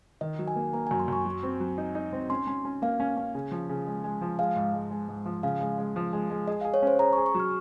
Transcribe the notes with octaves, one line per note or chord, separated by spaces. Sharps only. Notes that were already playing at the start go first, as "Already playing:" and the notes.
D#3 D#5
F#3
G#5
A#3
A#3 A#5
G#5
F#2
C6
F#2 C#6
F#3
C4
F#3
D#4
D#4
C4
C#4 C6
C#4
C#4
A#3 F5
C#4
C#4
C#3
F3
C#3
G#3
G#3
F3
G#3 F5
G#2
G#3
G#3
G#2
F3
C#3 F5
G#3
G#3
F3
G#3
G#3
G#4 D#5
F5
G#4
C#5
C#4 C5
G#4 A#5
C#6
G#4
C#6
F#3
F6